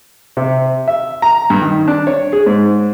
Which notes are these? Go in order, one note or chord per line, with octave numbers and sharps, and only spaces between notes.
C3
E5
A#5
G2
D#3
D4
C#5
G#4
G#2